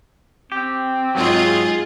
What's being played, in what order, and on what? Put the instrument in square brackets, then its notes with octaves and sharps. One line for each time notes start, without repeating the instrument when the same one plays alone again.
[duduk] C4 [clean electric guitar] G4
[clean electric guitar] G#2 F#3 [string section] F4 G#4 D#5